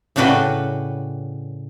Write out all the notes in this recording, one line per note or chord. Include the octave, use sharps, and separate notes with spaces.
A2 C#3 D4 F#4 B4 G5